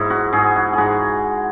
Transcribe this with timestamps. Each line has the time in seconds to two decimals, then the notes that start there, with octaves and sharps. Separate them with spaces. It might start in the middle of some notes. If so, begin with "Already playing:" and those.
Already playing: G#2 E4
0.10 F#4
0.33 G#2 G#4
0.56 F#4
0.73 G#2 F#4 G#4